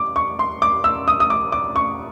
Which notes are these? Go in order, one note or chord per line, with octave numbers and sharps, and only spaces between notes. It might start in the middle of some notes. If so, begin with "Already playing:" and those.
Already playing: D6
C#6
C6
D6
E6
D#6
D#6
D6
D6
C#6